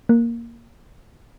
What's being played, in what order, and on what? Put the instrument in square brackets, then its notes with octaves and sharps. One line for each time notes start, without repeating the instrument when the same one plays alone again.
[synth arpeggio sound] A#3